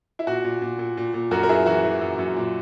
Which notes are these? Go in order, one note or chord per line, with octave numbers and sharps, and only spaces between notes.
E4
A#2 F#4
A#2
A#2
A#2
A#2
A#2
F#2 F#4 A#4
A#4
F#2 E4 G#4
E3 F#4
E3
F#2
F#2
A#2